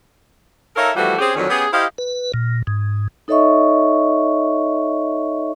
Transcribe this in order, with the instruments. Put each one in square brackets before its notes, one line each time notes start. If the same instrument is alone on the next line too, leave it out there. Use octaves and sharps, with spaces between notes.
[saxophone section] D#4 A4 A#4 C#5 E5 F5
E3 F3 G3 A3 F#4
C4 C#4 G4 G#4
F2 D3 D#3 F#3 C#4
B3 C#4 G4 G#4
E4 G4 C5 D#5 F5
[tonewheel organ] B4
A#2
G#2
[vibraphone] D#4 A4 C#5 D#5 E5 C#6